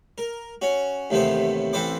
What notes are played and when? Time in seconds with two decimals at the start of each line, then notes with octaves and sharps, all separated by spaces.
0.18 A#4
0.62 C#4 F#4
1.10 D#2 A2 C3 E3 B3 C5
1.73 A1 C4 A4 B4 C5 D6